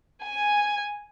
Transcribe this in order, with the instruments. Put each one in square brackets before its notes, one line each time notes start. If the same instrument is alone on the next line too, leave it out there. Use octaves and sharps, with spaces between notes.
[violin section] G#5